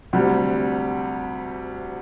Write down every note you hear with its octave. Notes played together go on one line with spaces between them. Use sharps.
D2 C3 G3